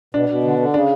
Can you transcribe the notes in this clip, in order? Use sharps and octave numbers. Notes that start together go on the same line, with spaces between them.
B2 D4
B2
D3
D3
C#3 D4